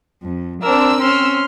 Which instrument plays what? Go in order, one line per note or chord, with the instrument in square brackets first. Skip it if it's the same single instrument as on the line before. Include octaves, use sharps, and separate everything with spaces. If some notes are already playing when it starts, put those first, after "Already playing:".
[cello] F2
[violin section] C4 E6 [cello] D4 [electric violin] A#4
[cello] C#4 [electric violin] C6 F6